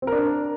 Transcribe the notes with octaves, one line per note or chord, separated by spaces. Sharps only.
C4 D4 A#4